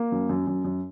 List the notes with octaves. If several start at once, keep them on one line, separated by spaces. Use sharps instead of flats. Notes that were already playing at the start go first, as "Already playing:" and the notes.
Already playing: A#3
F#2
F#2
F#2
F#2